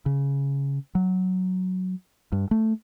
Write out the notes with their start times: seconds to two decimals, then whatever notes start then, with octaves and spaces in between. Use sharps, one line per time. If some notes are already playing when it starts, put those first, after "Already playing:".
0.06 C#3
0.95 F#3
2.32 G2
2.51 A3